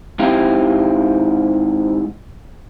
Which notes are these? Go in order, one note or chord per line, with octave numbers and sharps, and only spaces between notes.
G#2 C4 E4 G4 F5